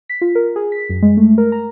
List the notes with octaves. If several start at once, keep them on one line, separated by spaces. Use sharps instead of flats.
B6
F4
A#4
G#4
B6
F#2
G#3
A3
A#4
A#5